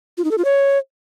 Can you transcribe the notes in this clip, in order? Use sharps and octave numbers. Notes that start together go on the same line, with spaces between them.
F4
D#4
A4
F4
C#5